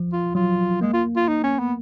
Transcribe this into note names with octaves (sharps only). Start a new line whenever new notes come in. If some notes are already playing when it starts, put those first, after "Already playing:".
Already playing: F3
F4
F#3 F4
G#3 A#3
F4
F4
D#4
C#4
B3